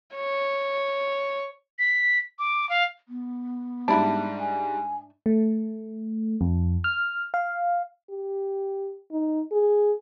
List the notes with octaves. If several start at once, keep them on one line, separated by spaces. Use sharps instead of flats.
C#5
B6
D6
F5
B3
G#2 G3 D4 E4
G#5
A3
F2
F6
F5
G4
D#4
G#4